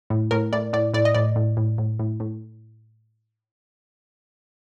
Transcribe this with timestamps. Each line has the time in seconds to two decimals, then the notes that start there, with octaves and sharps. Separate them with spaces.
0.10 A2
0.31 A2 A#4
0.53 A2 D5
0.73 A2 D5
0.94 A2 D5
1.05 D#5
1.15 A2 D5
1.36 A2
1.57 A2
1.78 A2
1.99 A2
2.20 A2